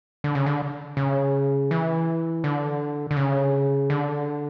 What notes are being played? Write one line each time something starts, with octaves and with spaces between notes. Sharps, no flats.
D3
C#3
D3
C#3
E3
D3
D3
C#3
D3